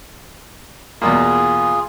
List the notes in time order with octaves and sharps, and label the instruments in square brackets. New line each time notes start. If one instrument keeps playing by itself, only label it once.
[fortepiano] E2 B2 A#3 [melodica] F4 G#4